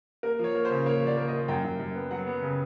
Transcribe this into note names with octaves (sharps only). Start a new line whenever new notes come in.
A#3 A#4
F3 C#5
A#3
C5
C#3
A#3 C#5
F3 D5
A#3
A#3 D#5
F#2 G5
F#2
F#2
B3
F#3 F#5
B3
C#3